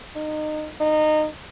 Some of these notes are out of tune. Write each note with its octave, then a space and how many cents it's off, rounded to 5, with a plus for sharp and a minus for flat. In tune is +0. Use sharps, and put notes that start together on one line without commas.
D#4 -25
D#4 -20